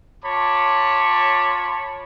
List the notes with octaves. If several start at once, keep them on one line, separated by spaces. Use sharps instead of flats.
F4 C#5 A5 B5 D6